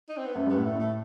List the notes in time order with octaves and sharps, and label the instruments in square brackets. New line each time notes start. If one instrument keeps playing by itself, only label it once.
[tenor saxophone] D#4
C4
B3
[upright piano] F#2 [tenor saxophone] A3
[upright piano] G2 [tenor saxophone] B3
[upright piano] A2
[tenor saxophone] A3
[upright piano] A2 [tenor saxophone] A3